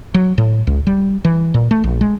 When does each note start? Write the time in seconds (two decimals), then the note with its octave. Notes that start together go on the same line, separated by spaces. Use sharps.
0.14 F#3
0.38 A2
0.67 C#2
0.87 G3
1.25 E3
1.54 A#2
1.71 A3
1.84 A#1
2.01 G#3